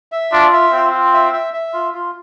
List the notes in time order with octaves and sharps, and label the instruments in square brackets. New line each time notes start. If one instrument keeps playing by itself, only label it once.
[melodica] E5
[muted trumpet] D4 [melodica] F4
[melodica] E5
[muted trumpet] C4 [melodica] F4
[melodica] F4
E5
E5
E5
F4
F4